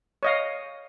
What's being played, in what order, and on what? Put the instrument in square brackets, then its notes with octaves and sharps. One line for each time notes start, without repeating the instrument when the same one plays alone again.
[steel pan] C#5 D#5 F5